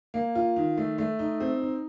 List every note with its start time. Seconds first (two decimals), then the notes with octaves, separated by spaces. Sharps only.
0.14 A#3
0.35 F4
0.56 D#3
0.77 A3
0.98 A3
1.19 D#4
1.40 C4
1.62 D#4